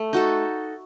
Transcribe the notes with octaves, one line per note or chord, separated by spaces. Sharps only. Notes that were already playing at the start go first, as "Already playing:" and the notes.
Already playing: A3
D#4 F#4 A4